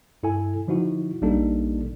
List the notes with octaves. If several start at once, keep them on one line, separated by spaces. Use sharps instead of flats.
G2 E4 A4 G#5
D3 F3 D#4 E4 F#4
A#1 G3 A#3 D4 D#4 A4